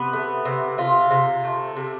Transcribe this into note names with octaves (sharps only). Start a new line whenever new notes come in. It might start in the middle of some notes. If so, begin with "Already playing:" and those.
Already playing: C3 B3
A3
C3
C3 F4
C3
A3
C3